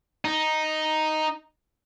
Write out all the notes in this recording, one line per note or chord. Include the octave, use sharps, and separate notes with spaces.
D#4